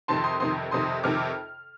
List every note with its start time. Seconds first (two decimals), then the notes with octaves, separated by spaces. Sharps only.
0.08 F2 C3 D#3 A5 C6
0.24 C6 D#6
0.40 F2 C3 D#3 C6 D#6
0.71 F2 C3 D#3 C6 D#6
1.03 F2 C3 D#3 D6 F6